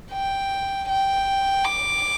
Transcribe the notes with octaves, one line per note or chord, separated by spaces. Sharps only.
G5
G5
D6